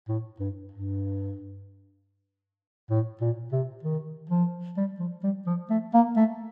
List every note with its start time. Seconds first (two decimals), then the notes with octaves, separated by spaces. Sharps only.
0.09 A2
0.40 G2
0.71 G2
2.90 A2
3.21 A#2
3.52 C3
3.83 D#3
4.30 F3
4.77 G3
4.99 F3
5.23 G3
5.47 F3
5.70 A3
5.94 A#3
6.17 A3